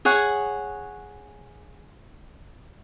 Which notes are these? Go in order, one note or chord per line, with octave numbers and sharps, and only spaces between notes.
G#4 C#5 F#5